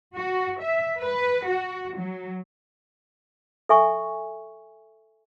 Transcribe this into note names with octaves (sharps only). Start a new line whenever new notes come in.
F#4
E5
B4
F#4
F#3
A4 E5 G#5 C#6